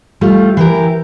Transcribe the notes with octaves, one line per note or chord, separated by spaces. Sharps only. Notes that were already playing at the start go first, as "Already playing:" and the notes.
G3 A3 F4
E3 G4 A#4